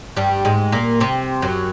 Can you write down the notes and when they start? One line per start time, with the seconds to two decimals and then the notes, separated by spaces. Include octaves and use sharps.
0.16 G2 G3
0.45 G#2 G#3
0.72 A#2 A#3
1.00 C3 C4
1.42 F#2 F#3